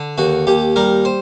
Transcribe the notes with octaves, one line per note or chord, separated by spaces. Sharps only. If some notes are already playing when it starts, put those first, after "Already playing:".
Already playing: D3
D#2 F#4
D#2 G4
G3 A#4
C5